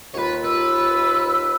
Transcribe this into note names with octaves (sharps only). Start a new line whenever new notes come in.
D#2 F4 B4 C#5
B4 E6